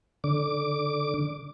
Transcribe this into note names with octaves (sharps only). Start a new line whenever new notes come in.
D3 D6